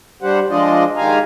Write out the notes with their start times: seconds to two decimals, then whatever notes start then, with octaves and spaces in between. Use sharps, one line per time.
0.22 G3 D4 G4 C5 F#5
0.50 F3 G#3 D4 F4 D5 D#5
0.97 D#3 G#3 G4 F5 G#5 A#5